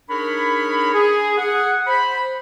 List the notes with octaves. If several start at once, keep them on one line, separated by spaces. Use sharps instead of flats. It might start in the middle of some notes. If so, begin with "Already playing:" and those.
D4 D#4 G#4 A#4 C#5 B5
G#4
G#4 F#5
C5 B5